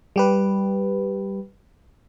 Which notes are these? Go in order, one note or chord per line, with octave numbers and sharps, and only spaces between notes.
G3 G4 B4